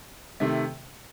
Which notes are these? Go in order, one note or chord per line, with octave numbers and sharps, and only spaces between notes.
C3 D#3 A3